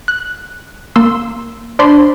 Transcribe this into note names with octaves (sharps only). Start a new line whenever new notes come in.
F#6
A#3 C6 E6
D4 C5 B5 C6